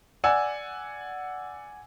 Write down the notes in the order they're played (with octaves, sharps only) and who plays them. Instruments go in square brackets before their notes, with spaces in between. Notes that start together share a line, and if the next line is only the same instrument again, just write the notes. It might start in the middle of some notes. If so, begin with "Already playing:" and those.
[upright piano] D5 F#5 G#5 E6